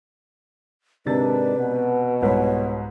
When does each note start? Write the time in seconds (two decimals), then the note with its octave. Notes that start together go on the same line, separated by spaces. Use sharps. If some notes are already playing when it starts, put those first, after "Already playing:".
1.06 G#2 C3 D#3 D4 B4 A6
1.59 B2
2.22 C2 G#2 B4 C#5